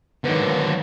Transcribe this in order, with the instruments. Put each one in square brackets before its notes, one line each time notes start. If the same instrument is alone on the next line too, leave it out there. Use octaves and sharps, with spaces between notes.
[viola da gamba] G#2 D#3 [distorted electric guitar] D3 F#3 [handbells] B3 B4